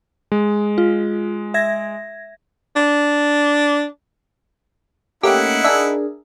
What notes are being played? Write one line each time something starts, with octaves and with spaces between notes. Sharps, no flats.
G#3
F4
E5 G#6 A#6
D4
A3 A#3 C#4 D#4 E4 G4 F#5
D4 G#4 A#4 E5